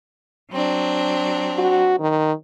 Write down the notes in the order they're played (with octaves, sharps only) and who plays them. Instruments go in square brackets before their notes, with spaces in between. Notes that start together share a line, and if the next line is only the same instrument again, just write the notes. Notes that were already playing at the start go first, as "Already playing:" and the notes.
[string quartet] F#3 C4 D4
[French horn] F#4
D#3